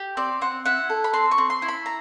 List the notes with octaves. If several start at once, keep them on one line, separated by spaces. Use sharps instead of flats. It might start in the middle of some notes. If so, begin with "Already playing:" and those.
Already playing: G4
C4 D5
C4 F#5
E4 F#5
A4
B5
C4 C6
C#6
C4
C6
E4
B5
A#5